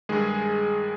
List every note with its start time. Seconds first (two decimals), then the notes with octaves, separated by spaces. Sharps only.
0.09 G2 D#3 G#3 G#4